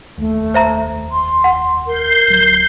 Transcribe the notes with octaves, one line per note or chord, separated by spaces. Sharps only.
F1 D#2 A3
C5 E5 A#5
C6
F#5
A#4 G6 C7
D1 F#3